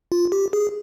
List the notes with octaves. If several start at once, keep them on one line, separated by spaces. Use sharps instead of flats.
F4
G4
G#4